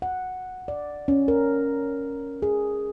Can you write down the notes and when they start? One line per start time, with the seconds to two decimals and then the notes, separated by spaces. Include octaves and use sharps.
0.02 F#5
0.68 D5
1.08 C#4
1.28 A#4
2.42 G#4